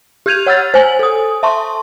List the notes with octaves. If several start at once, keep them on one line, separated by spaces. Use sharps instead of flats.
G4 F6 G6 G#6 D#7 F7
C#5 F#5 E6 F6 A6
C5 G#5 F#7
A4 D#6
E5 A5 C6 C#6